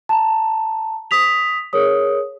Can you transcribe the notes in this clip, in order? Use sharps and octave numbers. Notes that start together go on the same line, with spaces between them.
A5 A#5
D#6 B6 F7
G#4 A#4 C#5 D#6